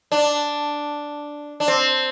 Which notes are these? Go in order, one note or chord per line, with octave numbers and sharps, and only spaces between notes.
D4
D4
C4